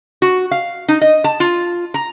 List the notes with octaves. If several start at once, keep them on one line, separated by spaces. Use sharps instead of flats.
F#4
F5
D#4
D#5
A5
F4
A#5